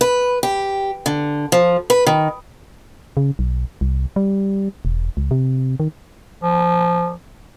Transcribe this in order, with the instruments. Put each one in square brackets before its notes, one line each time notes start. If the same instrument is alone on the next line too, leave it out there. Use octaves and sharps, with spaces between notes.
[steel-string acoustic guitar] B4
G4
D3
F3
B4
D#3
[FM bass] C#3
B1
C2
G3
E1
C#2
C3
D#3
[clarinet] F3